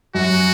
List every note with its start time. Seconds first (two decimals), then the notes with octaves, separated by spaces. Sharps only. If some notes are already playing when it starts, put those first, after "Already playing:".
0.15 F#2 F#4